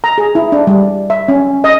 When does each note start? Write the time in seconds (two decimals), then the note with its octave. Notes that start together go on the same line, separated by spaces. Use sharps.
0.04 A#5
0.18 G#4
0.35 E4
0.52 D4
0.67 G3
1.10 E5
1.28 C#4
1.64 D#5